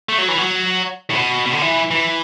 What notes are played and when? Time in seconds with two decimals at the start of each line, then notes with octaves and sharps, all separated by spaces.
0.09 A3
0.18 F#3
0.28 E3
0.38 F#3
1.10 A2
1.15 B2
1.46 B2
1.53 D3
1.61 E3
1.91 E3